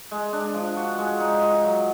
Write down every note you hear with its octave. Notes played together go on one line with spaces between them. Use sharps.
G#3
D4
F3
F#4
G#3
D#4
F4
F#3